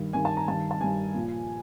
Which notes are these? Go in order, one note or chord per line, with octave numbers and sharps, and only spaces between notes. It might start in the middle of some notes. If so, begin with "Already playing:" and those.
Already playing: G2 D#3
G2 D#3 G#5
A5
A#5
G2 D#3 A5
A5
G2 D#3 G#5
A#2 F3